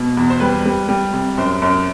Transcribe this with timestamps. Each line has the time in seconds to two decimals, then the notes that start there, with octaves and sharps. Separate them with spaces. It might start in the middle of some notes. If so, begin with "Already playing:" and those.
Already playing: B2
0.17 E2
0.30 C5
0.40 G3 B4
0.66 G3
0.89 G3
1.14 C3
1.38 F#2 C5
1.62 F#2